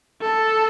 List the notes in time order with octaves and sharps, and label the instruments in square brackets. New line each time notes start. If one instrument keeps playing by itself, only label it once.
[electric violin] A4